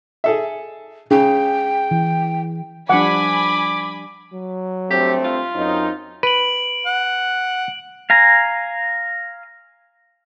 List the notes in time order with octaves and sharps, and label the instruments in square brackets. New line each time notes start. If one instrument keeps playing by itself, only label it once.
[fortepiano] G#4 A4 E5
[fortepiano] C#3 [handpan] G#4 [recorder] G5
[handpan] E3
[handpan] F3 G3 D4 [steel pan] F#5 [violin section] G#5 B5 [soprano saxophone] D6
[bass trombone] F#3
[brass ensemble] G2 A3 C4 [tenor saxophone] G4
[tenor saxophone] F4
[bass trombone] F#2 [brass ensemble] C4 C#4 D#4
[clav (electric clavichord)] B4 [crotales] D7 F#7
[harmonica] F#5
[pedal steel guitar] F5 G#5 A#5